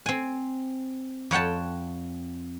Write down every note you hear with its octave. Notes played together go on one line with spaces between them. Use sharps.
C4 G#5
F2 C#5 F#5 G5 A5